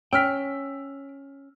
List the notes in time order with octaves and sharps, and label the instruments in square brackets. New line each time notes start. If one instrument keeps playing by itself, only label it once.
[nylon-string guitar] C#4 [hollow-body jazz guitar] G5 [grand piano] E6 F6 B6